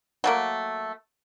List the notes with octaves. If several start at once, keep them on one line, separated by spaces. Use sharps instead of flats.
F#3 A3 A#3